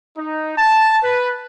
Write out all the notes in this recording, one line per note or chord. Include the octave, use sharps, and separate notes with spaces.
D#4
A5
B4